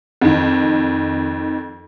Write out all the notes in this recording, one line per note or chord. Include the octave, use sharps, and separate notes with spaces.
F2 D#3